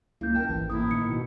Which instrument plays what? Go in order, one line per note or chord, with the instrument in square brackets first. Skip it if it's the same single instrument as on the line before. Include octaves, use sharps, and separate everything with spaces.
[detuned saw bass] C#2 [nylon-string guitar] A#3 [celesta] E4 G6
[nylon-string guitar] A#4 G5 A5
[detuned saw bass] A1 [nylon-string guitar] G#2 E3
[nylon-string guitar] A2 C3 A#3 [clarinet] E4 [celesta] D#6
[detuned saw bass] D#3 [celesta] C#7
[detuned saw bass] B2